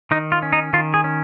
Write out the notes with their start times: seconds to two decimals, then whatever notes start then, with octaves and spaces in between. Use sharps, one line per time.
0.11 D#3 D#4
0.32 F4
0.42 C#4
0.53 D#4
0.73 D#3 F4
0.94 G#4
1.04 C#4